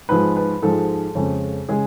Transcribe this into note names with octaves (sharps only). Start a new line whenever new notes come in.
G#2 F3 G#3 B4
B4
G#2 F3 G#3 A4
F2 C#3 G#3
C#3 G#3 G#4